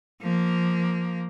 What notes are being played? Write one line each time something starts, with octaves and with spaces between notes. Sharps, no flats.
F3 A#3